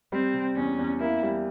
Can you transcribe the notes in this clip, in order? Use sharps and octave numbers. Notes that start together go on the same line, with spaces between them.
G3 C4
C3
E2 C#4
E2
A#3 E4
G3